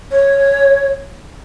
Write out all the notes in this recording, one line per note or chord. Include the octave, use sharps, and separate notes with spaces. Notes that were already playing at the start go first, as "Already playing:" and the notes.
C#5